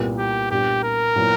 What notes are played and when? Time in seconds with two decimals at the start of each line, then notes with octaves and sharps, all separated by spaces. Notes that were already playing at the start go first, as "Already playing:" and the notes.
Already playing: C2 A#2 G3 B3
0.18 G4
0.51 A#2 G3 B3 D4 G4
0.84 A#4
1.16 A#2 F#3 B3 E4